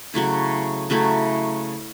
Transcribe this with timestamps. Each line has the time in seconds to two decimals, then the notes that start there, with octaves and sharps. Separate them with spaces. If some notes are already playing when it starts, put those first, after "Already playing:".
0.14 C#3 F#3 A3 E4
0.90 C#3 F#3 A3 E4